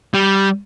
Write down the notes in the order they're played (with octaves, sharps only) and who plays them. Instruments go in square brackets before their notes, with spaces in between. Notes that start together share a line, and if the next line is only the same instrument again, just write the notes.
[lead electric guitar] G3